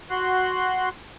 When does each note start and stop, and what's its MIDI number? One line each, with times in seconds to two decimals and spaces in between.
0.10 0.89 66
0.10 0.89 84
0.10 0.89 90